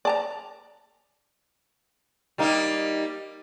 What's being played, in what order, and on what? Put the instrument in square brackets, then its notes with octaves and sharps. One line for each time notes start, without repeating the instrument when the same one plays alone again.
[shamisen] D5 A5 A#5
[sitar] G3 A#3 D#4